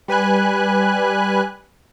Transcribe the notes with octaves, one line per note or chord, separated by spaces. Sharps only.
G3 B4 G#5 F#6